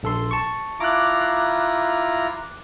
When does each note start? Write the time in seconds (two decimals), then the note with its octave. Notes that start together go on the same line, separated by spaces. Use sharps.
0.03 A#1 A4 C6
0.31 A5 C#6
0.80 E4 F4 A#5 D6 F#6